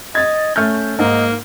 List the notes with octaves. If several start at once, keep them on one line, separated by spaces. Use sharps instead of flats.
D#5 G#6 A6
A3 C#4 F6 G6
G#2 A#3 D#5